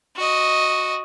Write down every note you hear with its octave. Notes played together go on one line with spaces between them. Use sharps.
F#4 D#5